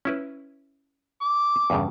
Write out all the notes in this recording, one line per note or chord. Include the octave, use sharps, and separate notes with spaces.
C#4 E4 B4
D6
E2 G2 C#3